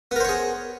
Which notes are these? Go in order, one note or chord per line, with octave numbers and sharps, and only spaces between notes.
B3 G#4 A#4 C5 C#5